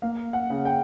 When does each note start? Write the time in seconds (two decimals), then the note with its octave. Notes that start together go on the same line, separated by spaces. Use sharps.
0.02 A#3 F5
0.33 F#5
0.50 C#3
0.65 G5